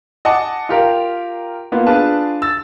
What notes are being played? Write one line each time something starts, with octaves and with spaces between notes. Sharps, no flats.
D#5 F#5 G#5 A5 D6
F4 G4 A#4 F5
A#3 B3 F4
D4 F4 G#4 B4 A5
E6 A6